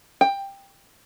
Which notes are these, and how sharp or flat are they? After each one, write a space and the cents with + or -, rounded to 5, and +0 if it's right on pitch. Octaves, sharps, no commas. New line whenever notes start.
G5 +10